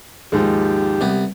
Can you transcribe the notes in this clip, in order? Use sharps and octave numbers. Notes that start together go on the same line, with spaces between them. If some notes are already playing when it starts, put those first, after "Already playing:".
D#2 G#2 F3 G#3 G4
C2 B3